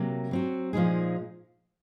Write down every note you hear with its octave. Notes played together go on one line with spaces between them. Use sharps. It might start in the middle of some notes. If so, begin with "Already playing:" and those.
Already playing: C3 F#3 A#3
F#3 C4 F#4
A#2 F3 G#3 D#4 G#4